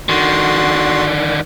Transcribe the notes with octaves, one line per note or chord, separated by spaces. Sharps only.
D3 D#3 F#4 C6